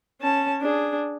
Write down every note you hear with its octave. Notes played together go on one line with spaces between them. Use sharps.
C#4 A5
D4 G#4